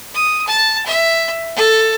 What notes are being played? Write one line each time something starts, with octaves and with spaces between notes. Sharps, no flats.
D#6
A5
E5
A4